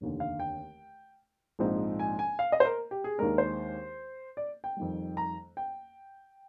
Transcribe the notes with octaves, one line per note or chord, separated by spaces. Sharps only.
F1 D#2 D3
F5
G5
A#1 G#2 F3 C4 D#4
G#5
G#5
F5
D#5
C5
A#4
G4
G#4
D#2 D#3 G#3 D4 A#4
C5
D5
G5
F2 D#3 G3
A#5
G5